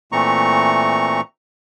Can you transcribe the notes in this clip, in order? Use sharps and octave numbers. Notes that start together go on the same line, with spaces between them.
A#2 E3 A3 C4 A#5 C#6